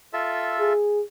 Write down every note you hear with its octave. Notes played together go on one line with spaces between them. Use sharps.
F4 A4 E5
G#4